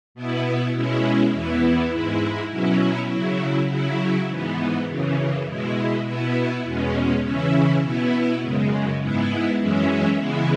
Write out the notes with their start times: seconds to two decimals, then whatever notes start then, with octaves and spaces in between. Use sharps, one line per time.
0.15 B2 B3 E4
0.74 B2 G#3 C#4 E4
1.33 E2 E3 B3 E4
1.92 G#2 G#3 E4
2.51 B2 F#3 C#4 E4
3.09 C#3 F#3 E4
3.69 C#3 F#3 E4
4.28 G#2 E3 B3
4.87 F#2 C#3 E3
5.46 B2 G#3 E4
6.05 B2 B3 E4
6.64 E2 B2 G#3 C#4
7.24 C#3 E3 C#4 E4
7.82 B2 B3 E4
8.42 F#2 C#3 G#3
9.00 G#2 G#3 B3 E4
9.60 F#2 E3 G#3 C#4 E4
10.19 C#3 E3 G#3 B3 E4